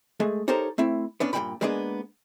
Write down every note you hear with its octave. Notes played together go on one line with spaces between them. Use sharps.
G#3 A3 G#4
D#4 G4 A4 A#4 C5 C#5
A3 C4 E4
B3 C#4 D4
G2 A#2 G#3 C#4 G5 B5
G3 G#3 A#3 B3 D4 G#4